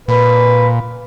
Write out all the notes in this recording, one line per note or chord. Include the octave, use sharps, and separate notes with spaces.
A#2 B4